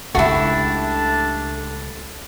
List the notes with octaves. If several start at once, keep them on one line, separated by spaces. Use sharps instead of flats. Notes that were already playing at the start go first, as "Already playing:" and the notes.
C#2 C#3 A3 D4 E4 F#4 G4